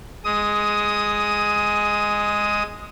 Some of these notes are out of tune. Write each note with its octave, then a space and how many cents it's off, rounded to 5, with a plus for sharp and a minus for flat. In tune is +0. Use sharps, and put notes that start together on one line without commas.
G#3 +0 D#6 +15